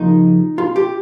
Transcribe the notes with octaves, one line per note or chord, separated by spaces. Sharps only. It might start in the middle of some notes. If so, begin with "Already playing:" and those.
Already playing: D#2 C#3 F3 A#3 D#4
F4
G4